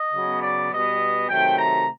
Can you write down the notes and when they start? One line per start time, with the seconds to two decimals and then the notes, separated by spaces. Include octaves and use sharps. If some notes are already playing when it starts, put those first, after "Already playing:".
Already playing: D#5
0.13 C#3 F#3 B3
0.42 D5
0.71 B2 G3 B3 D#5
1.28 C3 D#3 F#3 A3 G5
1.57 A#5